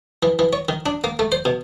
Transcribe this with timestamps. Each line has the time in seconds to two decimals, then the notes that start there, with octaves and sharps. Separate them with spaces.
0.23 E3
0.39 E3
0.53 C#5
0.69 D#3
0.86 D4
1.04 A#3
1.19 A3
1.32 C5
1.45 B2